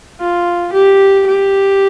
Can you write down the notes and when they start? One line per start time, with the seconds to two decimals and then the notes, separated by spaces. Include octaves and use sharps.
0.20 F4
0.73 G4
1.27 G4